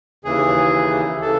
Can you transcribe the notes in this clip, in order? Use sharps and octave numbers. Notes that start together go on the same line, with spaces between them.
D#2 C#3 E3 G#4
C#3 E3 A4